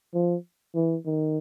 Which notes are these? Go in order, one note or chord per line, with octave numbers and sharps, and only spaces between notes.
F3
E3
D#3